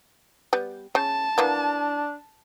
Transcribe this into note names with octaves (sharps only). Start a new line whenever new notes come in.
G3 B3
C#3 A5
E3 A#3 B3 D4